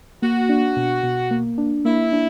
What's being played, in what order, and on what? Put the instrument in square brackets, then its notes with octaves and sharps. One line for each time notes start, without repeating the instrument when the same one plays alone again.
[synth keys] A#3 [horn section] F#4
[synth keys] D4
B2
B2
A#3
D4
[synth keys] A#3 [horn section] E4
[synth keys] D4